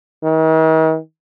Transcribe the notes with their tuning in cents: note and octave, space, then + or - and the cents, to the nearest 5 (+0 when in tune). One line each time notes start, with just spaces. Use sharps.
D#3 +45